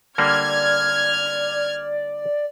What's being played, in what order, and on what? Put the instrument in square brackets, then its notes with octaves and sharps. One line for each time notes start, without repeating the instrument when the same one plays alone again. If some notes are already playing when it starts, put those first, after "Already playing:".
[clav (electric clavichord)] D3 G3 A#3 [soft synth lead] D5 [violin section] F6 G#6